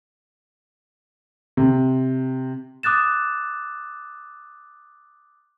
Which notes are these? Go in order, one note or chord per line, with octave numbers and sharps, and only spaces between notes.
C3
D6 D#6 F#6 A6 E7